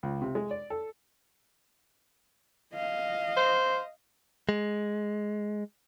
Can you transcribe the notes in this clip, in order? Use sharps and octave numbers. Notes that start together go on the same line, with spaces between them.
C#2
C3
G#3
D5
A4
D#5 F5
C5
G#3